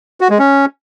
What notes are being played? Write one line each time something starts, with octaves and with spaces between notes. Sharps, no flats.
F#4
G#3
C#4